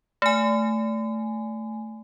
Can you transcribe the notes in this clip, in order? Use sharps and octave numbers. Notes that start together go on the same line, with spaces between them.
A3 G#5